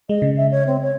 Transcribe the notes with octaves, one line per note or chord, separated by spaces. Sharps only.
G#3 D#5
C#3
E5
C#5
C4
C#5